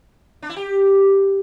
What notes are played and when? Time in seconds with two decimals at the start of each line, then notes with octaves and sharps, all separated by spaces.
0.42 D4
0.49 E4
0.56 G4